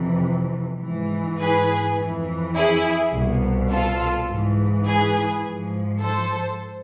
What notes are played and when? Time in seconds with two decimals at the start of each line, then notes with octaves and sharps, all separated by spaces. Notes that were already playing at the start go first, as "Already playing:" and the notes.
Already playing: F2 C3 E3
0.82 G#2 E3
1.39 G#4 B4
1.97 F2 E3
2.55 E4 G#4
3.12 C2
3.17 B2
3.70 F4 A4
4.28 G#2 E3
4.86 G#4 B4
5.44 G#2 F3
6.01 A4 C5